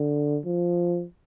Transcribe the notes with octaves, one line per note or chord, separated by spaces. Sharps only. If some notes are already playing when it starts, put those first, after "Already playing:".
Already playing: D3
F3